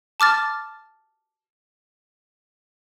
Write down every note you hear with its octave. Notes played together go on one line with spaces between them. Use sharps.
A5 D6 F6 A6